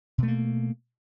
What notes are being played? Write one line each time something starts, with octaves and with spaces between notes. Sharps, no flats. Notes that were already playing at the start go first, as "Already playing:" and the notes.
B2 A3 A#3